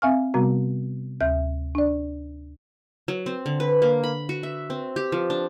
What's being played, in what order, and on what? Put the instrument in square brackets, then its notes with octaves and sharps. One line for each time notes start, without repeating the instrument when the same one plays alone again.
[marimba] C4 E5 F5 G#5 C#6 F6
C3 G3 B3 F#4 A#5
D2 E5 G6
D4 D5
[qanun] F#3
C4
D3
B4
A#3
B5
F#4
E5
C4
G4
F3
D4